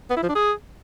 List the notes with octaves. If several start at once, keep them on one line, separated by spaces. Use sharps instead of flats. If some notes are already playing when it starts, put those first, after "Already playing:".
B3
E4
F3
D4
G#4